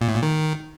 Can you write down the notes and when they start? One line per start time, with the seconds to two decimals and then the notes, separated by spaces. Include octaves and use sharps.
0.01 A#2
0.08 A2
0.15 A#2
0.23 D#3